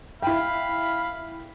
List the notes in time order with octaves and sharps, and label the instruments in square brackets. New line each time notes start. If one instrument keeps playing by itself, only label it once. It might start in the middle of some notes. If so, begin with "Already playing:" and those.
[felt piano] E4 G5 [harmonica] F5 B5